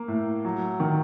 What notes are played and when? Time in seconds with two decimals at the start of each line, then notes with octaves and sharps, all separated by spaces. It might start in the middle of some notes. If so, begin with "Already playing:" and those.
Already playing: A#3
0.08 A2
0.45 F#3
0.80 D#3